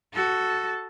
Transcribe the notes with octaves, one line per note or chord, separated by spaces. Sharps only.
F#4 A4